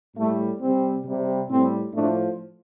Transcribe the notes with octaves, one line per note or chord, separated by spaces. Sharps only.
A2 G3 A3
C3 G3 C4
C3 G3
A2 G3 C4
A2 F3 A3 D4